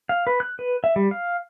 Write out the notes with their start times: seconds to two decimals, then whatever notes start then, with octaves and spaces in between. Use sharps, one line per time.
0.09 F5
0.27 B4
0.40 F#6
0.59 B4
0.84 E5
0.96 G3
1.11 F5